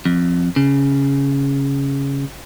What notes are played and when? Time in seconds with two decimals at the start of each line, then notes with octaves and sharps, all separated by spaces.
0.05 F2
0.56 C#3